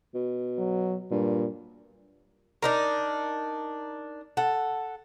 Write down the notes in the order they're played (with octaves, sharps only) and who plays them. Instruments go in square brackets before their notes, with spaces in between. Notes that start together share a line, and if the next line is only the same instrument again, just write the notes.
[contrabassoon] B2
[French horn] F#3
[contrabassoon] G2 [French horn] A#2
[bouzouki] D4 D#4 A#4
A4 F#5